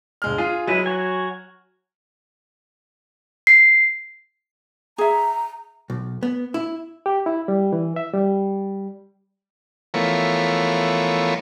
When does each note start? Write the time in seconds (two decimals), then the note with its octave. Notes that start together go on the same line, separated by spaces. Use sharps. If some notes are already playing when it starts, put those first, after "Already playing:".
0.22 G1 G#3 F6
0.38 F4 G#4
0.67 F#3 G#3 E4 B4
0.86 F#4 C#5 G#5
3.47 C7
4.98 G#4 E5 A#5
5.90 B1
6.23 B3
6.54 E4
7.06 G4
7.26 E4
7.48 G3
7.73 E3
7.96 E5
8.13 G3
9.94 E3 F3 A3 B3 A#4 C#5